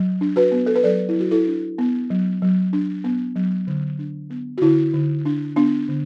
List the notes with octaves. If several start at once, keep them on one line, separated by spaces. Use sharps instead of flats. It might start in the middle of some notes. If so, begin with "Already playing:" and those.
Already playing: F#3
D4
F#4 B4
B3
A4
B4
F#3 A4 D5
E4
F#3 F#4
E4 A4
D4
B3
F#3
F#3
D4
B3
F#3
D3
D4
B3
F#4
D3 E4
D3
D4
B3 D4
D3